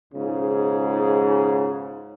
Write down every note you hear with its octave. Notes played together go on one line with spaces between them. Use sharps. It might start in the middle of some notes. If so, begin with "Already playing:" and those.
B1 G#2 C#3 F4